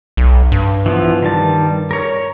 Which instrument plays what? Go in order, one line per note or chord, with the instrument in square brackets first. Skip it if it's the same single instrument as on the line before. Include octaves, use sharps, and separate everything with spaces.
[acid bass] B1
G2
[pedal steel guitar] E3 F3 B3
D#3 G3 A5
A#4 C#5